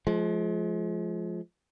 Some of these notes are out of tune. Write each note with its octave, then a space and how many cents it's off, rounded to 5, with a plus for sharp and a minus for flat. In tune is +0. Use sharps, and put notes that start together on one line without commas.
F3 +0 G#3 +35